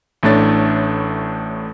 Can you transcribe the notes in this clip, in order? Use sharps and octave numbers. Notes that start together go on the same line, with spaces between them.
A1 A2 A3 D4 C#5 A6